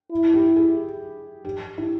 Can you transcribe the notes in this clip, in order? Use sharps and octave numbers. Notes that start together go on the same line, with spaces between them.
E4
G4
G#4
G4
E4